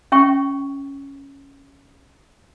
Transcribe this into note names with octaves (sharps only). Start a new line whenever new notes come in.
C#4 E5 G5 C#6